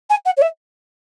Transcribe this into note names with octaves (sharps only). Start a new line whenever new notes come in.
G#5
F#5
C#5
E5